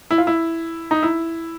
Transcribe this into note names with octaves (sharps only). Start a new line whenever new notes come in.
E4
F4
E4
D#4
E4